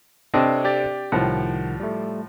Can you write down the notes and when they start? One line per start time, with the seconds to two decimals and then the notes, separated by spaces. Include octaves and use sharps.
0.34 C3 C4 D4 A4 C#5 D#5
0.65 G4 D5 A6
1.12 C2 A2 D#3 F3 F#5
1.80 G3 A3